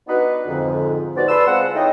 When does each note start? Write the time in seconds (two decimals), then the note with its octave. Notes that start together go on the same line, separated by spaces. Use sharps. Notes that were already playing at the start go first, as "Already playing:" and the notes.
0.07 B3 D4 D#4 F#4 B4
0.47 F2 G#2 D3
1.15 G#2 B3 F#4 C5 D5
1.28 B4 D5 A5 B5 C6 E6
1.46 G#3 C4 F4 F#5
1.74 A3 C#4 D#4 E4 D#5 G5